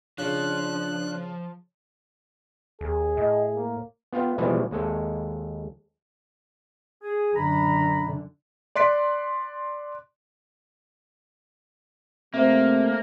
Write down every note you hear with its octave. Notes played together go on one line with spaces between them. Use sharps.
C#3 F3 D4 F#6
D#2 G#4
A2 D#5
A#3
B3 F4 F5 G5
B2 E3 F3 G3 G#3
D#2 G#3 A4
G#4
F#2 D3 A#5 B5
D5 C6 F#6 B6 D7
C3 A3 A#3 C5 E5